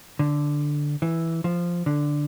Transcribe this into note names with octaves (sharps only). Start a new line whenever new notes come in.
D3
E3
F3
D3